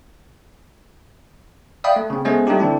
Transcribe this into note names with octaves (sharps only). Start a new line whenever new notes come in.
D5 E5 F5 G5 B5 D#6
A3
C#3 C4
G#3 A3 B3 C#4 G#4 C5
G3 A3 C4 D4 D#4 G4
D3 E3 C4 D4 E4